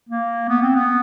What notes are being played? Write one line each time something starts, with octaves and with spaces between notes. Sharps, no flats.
A#3
B3
C4
B3